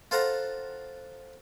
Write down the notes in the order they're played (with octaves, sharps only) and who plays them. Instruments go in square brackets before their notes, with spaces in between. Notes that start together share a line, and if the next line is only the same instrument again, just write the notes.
[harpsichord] F4 A4 C5 F5 F#5 A#5